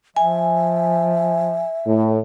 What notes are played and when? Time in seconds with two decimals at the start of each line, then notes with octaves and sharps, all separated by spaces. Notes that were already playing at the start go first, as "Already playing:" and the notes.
0.16 F3 E5 G#5
1.85 A2